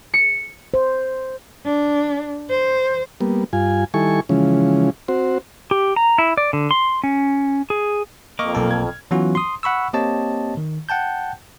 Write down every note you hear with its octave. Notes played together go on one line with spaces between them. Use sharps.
C#7
C5
D4
C5
G3 A#3 B3
G2 F4 G#5
D#3 G3 E4 A4 G#5 C#6
C#3 E3 F3 G#3 C#4
C4 F#4 C5
G4
A#5
E4
D5
D3
C6
C#4
G#4
F2 A#3 D#5 C#6 D6 F6
B1 A#2 A4
G#6
E3 F#3 B3 C#4 F4 F#4
C6 D#6
F#5 B5 C#6 E6
A#3 C4 G4 C#5 D#5 A5
D#3
F#5 G5 A5 G6